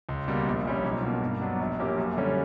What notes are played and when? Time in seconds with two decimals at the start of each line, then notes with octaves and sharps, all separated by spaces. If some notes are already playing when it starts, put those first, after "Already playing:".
0.09 C#2
0.28 B2 G3 A#3
0.46 A#1
0.65 A#2 G3 C#4
0.84 B1
1.03 B2 A#3
1.22 G2
1.41 F#3 B3 D4
1.59 A#1
1.79 A#2 A#3 C#4 G4
1.98 F#2
2.17 D3 G3 C#4